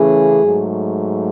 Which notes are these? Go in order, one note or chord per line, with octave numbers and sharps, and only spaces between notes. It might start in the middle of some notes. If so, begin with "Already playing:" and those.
Already playing: C#3 E3 A3 C#4 G#4
G#2 F#3 A3